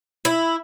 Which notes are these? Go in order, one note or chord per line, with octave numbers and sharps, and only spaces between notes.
E4